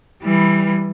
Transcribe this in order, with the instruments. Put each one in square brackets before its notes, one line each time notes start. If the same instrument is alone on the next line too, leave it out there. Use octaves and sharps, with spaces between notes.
[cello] E3 G3